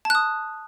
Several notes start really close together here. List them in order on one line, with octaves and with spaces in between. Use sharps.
A5 F#6 D#6